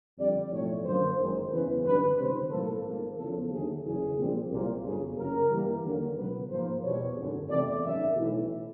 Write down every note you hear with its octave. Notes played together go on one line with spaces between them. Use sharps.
F2 D3 G3 D5
B1 A2 F3 A3 C4 C#5
F#2 D3 F#3 A#3 C5
F#1 F#2 D#3 G#3
E2 C#3 E3 B4
G#1 F#2 D3 G3 B4
C#2 C3 D#3 G3 C5
B1 A2 F#3 A#3 A4
G#1 G#2 F3 A#3
E2 C#3 F3 A4
D#2 D3 F#3 A3 G#4
F#1 E2 C#3 G#4
A#1 A#2 G3 C4
C2 A#2 F#3
G1 F#2 C#3 F#3 G#4
F#1 F#2 C#3 F#3 A#4
G2 E3 G3 A#3
D#2 D3 F#3 A#3
C#2 B2 F#3 B3 B4
G#2 F3 A#3 C5
E2 B2 G3 C#5
G#1 F#2 D3
E2 C3 E3 A3 C4 D5
G#1 F#2 D#3 E5
B1 A2 E3